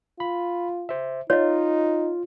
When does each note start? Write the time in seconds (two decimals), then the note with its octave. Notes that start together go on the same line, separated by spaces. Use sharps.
0.20 F4 B5
0.89 C5 E5
1.30 D#4 F4 C#5 D#5